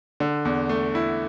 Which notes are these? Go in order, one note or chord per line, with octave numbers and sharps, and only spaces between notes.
D3
E2
A3
E4